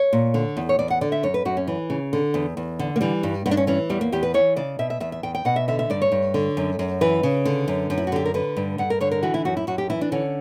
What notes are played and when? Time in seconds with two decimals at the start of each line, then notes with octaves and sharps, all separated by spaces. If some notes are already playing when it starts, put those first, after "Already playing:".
Already playing: C#5
0.13 A#2
0.34 D3
0.57 E2
0.69 C#5
0.79 E2 D5
0.90 F#5
1.01 D3 D5
1.12 E5
1.23 F#2 C#5
1.34 B4
1.45 F#2 F#4
1.57 C#4
1.67 E3
1.90 C#3
2.13 D3
2.34 E2
2.57 E2
2.79 D3
2.96 A#3
3.01 E3 G3
3.23 G2
3.46 G2 B3
3.51 D4
3.57 C#4
3.67 E3 C#4
3.90 E2 G3
4.01 A#3
4.12 E2 G4
4.23 B4
4.34 E3 C#5
4.56 C#3 D5
4.79 B2 E5
4.90 E5
5.00 E2 E5
5.12 E5
5.23 E2 G5
5.35 G5
5.45 B2 F#5
5.56 E5
5.68 D3 E5
5.79 E5
5.90 G2 D5
6.02 C#5
6.12 G2
6.34 D3
6.57 F#2
6.79 F#2
7.01 E3 B4
7.23 C#3
7.45 D3
7.68 F#2
7.90 F#2
7.98 E4
8.07 F#4
8.12 D3 G4
8.25 A#4
8.34 D3 B4
8.57 G2
8.78 G2 F#5
8.90 A#4
9.01 D3 C#5
9.11 A#4
9.23 E3 F#4
9.34 E4
9.45 F#2 F#4
9.57 E4
9.67 F#2 F#4
9.78 G4
9.90 E3 E4
10.01 D4
10.12 D3 C#4